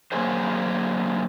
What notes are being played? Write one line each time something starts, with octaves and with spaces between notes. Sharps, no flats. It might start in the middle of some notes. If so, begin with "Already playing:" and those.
D3 F#3 A#3 F#4 G#4 C5